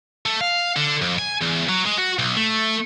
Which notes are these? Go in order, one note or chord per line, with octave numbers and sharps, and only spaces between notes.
A3
F5
D3
F2
G#5
E2
F#3
G#3
F#4
B1
A3